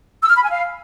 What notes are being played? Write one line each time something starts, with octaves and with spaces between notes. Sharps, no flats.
E6
F6
B5
G#5
F5